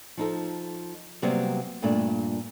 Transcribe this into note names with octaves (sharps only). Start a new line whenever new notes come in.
F3 D#4 A4
C3 F#3 G3 A#3 B3
G2 A#2 A3 A#3 D4